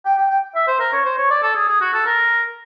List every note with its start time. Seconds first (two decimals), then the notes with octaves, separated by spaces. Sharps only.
0.05 G5
0.17 G5
0.30 G5
0.55 E5
0.68 C5
0.80 A#4
0.93 C#5
1.05 C5
1.18 C#5
1.30 D5
1.43 A4
1.55 G#4
1.68 G#4
1.81 F#4
1.93 A4
2.06 A#4